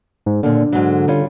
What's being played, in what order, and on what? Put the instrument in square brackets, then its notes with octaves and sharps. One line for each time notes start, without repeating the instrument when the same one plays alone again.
[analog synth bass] G#2
[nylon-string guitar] D#2 A#2 [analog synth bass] D3
[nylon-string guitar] G#2 F#3
G3 C#4 F4